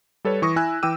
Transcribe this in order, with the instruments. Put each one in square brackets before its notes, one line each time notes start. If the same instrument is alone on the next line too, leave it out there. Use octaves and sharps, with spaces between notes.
[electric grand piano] G3 A4 B4 C#5
E3 C#6 D#6 A#6
E4 G#5 E6 F#6
E3 G5 D6 E6 D#7